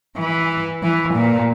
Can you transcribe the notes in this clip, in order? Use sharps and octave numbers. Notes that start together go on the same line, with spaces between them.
E3
E3
A#2